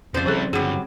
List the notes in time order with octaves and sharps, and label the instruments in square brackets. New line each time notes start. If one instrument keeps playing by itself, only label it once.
[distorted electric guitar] F2 [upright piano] C#3 C4 [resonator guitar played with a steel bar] C5 D5
[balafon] F3 G#4 A4 [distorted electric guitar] G3 E4
[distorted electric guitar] G2 D3 [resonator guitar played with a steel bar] F#3 G3 [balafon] G#4